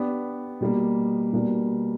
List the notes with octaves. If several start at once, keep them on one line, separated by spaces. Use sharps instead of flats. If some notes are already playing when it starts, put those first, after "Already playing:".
Already playing: B3 D4 G4
B2 G3 A#3
B2 G3 A#3 D4